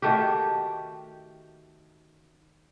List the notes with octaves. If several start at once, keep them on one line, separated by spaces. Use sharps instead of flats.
D#3 A3 F#4 G4